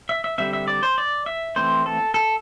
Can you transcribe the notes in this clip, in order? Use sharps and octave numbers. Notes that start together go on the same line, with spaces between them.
E5
E5
D3 G3 C4 E5
E5
D5
C5
D5
E5
E3 A3 C4 C5
A4
A4